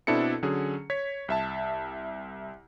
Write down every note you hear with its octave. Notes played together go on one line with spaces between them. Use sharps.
B2 C4 D4 E4 A4 C#7
D3 F#3 C#4 G#4
C#5 G#6 B6
C2 E5 A5